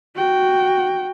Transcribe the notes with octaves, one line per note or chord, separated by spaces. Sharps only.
F#4 G5